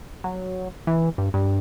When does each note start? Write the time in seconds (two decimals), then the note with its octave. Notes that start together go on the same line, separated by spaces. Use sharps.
0.24 F#3
0.87 E3
1.18 G2
1.34 G2